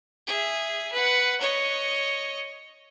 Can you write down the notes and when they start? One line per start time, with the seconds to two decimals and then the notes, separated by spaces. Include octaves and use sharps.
0.27 G#4 E5
0.93 B4 F#5
1.40 C#5 D#5